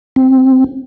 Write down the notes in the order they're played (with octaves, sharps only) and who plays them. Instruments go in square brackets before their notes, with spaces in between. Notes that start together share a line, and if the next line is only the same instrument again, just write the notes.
[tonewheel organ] C4